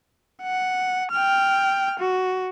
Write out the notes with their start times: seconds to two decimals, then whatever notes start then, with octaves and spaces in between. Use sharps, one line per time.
0.42 F#5
1.11 G5 F6
2.00 F#4